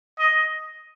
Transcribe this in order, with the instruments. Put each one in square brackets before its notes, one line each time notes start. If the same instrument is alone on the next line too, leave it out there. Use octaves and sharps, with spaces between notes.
[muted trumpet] D#5